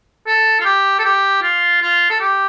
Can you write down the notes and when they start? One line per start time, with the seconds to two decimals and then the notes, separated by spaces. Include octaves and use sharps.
0.27 A4
0.60 F4
0.65 G4
0.99 A4
1.04 G4
1.42 F4
1.82 F4
2.10 A4
2.20 G4